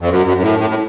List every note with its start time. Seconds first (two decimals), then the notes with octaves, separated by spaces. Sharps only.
0.01 F2
0.10 F#2
0.26 F#2
0.37 F#2
0.43 A2
0.59 A2
0.70 A2